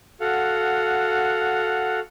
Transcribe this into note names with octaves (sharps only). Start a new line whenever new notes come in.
F#4 A4 F5 F#5